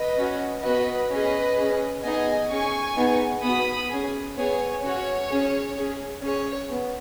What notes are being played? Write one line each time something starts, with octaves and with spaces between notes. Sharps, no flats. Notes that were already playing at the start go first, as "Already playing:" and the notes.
Already playing: B4 D#5
C#4 F#4
B3 F#4 B4 D#5
C#4 G#4 B4 D#5
C#4 G#4
B3 D#4 G#4 D#5 G#5
C#4 G#4 G#5 C#6
B3 D#4 G#4
B3 F#4 B5 D#6
C#4 G#4
B3 G#4 C#5
C#4 F#4 C#5
C#4 G#4
C#4 G#4
C#4 G#4 C#5
B3